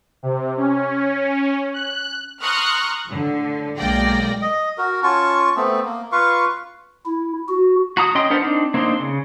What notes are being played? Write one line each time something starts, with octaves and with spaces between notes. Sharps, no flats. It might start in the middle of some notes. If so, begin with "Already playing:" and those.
C3
C#4
F#6
A#5 C6 C#6 D#6 F6 F#6
A2 D3
B1 G#3 A#3 D5 G5 A#6
D#5
F#4 A#4
C#4 F4 A5 C#6
A3 B3 C4
A#3
F4 B4 F5 C#6
E4
F#4
F#4 A#5 D#6
C#4 D#5 G5 C6 D#6
B3 D4 A#4 C5 F#5
C4 D4 D#4
A#3 C4 D4 D#4 C6
C#3